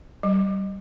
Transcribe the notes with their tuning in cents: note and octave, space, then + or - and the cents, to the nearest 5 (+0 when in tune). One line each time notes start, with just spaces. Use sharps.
G3 -20